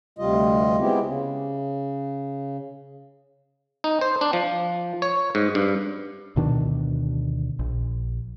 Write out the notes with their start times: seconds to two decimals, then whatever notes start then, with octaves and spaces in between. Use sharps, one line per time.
0.19 D2 C3 G3 F4 D#5
0.79 G#3 B3 C4 E4 G4
1.03 C#3
3.84 D#4
4.01 C5
4.21 D4
4.33 F3
5.02 C#5
5.35 G#2
5.55 G2
6.36 D2 B2 D#3 D4
7.59 A#1